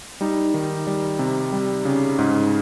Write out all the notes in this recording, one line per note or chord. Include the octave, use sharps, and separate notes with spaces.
G3 D#4
D#3
G3
C3
G3
C#3
G#2